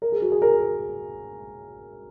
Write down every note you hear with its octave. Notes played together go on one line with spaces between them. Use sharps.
A#4
G#4
F#4
G#4
A#4